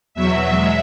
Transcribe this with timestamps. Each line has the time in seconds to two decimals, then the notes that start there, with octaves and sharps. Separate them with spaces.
0.14 E2 B2 F#3 E5
0.52 G#3